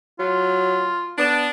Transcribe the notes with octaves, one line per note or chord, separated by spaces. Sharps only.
F#3 F4
B3 D4